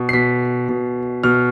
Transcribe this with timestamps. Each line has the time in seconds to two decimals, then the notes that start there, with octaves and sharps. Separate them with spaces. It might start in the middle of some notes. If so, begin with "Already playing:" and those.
Already playing: B2
0.09 C7
0.13 B2 B6
0.69 B2
1.23 B2 F6